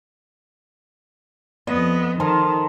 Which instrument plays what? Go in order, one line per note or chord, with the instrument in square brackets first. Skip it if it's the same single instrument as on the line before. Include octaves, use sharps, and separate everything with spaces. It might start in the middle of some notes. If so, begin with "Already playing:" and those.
[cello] F2 B3 [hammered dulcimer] D#5
[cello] D#3 [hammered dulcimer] A4 A#4 C5